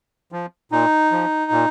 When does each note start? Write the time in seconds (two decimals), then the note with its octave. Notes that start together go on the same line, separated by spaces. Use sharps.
0.32 F3
0.72 A#2 D#4
1.12 F3
1.51 A#2